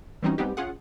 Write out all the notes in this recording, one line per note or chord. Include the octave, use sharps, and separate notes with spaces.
E3 G3 C4 C#4 D#4 F#4
G3 G#3 B3 C4 D#4 G4
C#4 F4 G#4 F#5